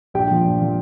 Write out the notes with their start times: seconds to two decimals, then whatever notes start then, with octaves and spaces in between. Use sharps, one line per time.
0.14 A#1 G4 G5
0.30 A#2 F3
0.44 A#1
0.59 A#2 F3